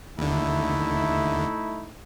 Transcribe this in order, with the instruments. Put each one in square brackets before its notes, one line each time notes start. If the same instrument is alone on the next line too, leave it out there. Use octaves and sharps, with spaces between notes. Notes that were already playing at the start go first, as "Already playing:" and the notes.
[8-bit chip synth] D#2 D3 [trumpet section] A3 D#4 E4